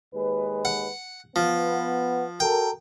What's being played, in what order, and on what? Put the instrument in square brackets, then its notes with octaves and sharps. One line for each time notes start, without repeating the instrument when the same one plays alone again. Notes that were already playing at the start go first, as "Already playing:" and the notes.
[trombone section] D#2 G#3 B4
[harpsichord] F#5
[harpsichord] F3 [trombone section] B3
[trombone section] F#4 A4 A#4 [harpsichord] G5